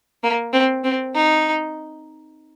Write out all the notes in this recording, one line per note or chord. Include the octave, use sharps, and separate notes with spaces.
A#3
C4
C4
D#4